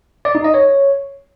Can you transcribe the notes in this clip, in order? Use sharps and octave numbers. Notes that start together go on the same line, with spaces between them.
D5
D#4
D#5
C#5